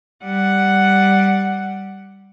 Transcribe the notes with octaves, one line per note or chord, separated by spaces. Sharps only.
G3 F#5